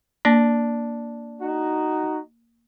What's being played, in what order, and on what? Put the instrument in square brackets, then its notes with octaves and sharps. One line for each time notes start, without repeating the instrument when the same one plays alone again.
[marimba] A#3 [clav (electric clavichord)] D4
[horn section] D#4 F#4